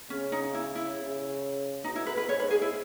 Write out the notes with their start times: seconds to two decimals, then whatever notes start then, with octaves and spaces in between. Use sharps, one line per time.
0.10 C#3 C#4
0.32 D#4
0.54 E4
0.75 E4
0.98 C#3
1.84 B2 D#4
1.96 E4
2.06 B4
2.17 B4
2.29 G#2 C#5
2.40 B4
2.50 G#4
2.62 E4